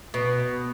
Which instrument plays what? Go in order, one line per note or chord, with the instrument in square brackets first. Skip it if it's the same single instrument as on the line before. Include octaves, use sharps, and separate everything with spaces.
[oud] B2